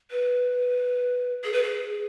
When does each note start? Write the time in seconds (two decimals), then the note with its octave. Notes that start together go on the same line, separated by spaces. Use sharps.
0.11 B4
1.44 G#4
1.53 B4
1.63 G#4